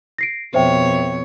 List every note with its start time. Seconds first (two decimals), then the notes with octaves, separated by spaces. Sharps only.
0.18 A#6 C7 D7
0.54 F2 B2 C5 C#5 E5 G5